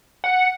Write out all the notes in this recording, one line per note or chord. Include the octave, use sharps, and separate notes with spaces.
F#5